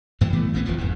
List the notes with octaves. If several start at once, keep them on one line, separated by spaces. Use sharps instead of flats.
F#2 A#2 E3 F#3
E3 A3 B3
A#1 E3 B3 C4
D1 E2 F3
F1 E2 G#2